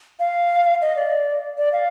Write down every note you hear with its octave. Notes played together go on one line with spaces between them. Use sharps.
F5
D#5
D5
D5
F5